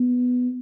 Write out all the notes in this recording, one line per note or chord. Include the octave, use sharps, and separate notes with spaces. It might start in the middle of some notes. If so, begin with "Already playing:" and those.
Already playing: B3